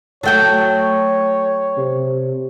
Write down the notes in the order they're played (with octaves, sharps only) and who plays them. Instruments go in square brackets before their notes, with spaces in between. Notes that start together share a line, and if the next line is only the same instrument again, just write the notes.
[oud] F#3 A3 F#4 [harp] A4 G5 [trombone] C#5
[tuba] C3